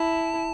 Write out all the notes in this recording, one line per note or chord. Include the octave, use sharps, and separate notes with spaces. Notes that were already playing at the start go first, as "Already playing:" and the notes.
Already playing: E4 A5